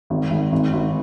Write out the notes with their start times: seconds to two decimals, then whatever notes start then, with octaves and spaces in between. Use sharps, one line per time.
0.10 G#1
0.31 G#1
0.52 G#1
0.73 G#1